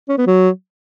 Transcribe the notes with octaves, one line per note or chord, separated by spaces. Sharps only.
C#4
B3
F#3